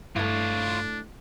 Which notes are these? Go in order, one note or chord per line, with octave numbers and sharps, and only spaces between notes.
G2 A3 D4 E4 F4 C#5